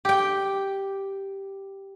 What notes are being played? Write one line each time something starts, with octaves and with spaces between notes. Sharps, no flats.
G4 G5